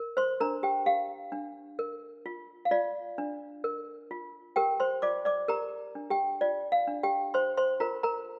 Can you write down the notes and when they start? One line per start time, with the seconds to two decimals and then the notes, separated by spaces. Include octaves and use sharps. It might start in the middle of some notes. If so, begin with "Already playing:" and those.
Already playing: A#4
0.17 C5 C6
0.40 D4 A#4 A#5
0.63 G4 G5
0.86 G4 F5
1.32 D4
1.79 A#4
2.26 F4
2.65 F5
2.71 F4 D5
3.18 D4
3.64 A#4
4.11 F4
4.56 G4 A#4 G5
4.80 C5 C6
5.02 F4 D5 D6
5.25 D5 D6
5.48 G4 A#4 A#5
5.95 D4
6.10 G4 G5
6.41 F4 D5
6.72 F5
6.87 D4
7.03 G4 G5
7.34 C5 C6
7.57 C5 C6
7.80 F4 A#4 A#5
8.03 A#4 A#5